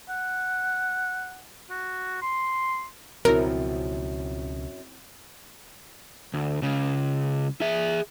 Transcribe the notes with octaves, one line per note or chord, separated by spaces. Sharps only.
F#5
F#4
C6
C#2 F#2 B2 F3 C4 E4 A#4
D2
C#2 C#3
G#4 E5